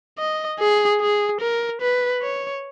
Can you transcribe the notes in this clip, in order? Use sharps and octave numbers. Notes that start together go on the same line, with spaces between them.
D#5
G#4
G#4
A#4
B4
C#5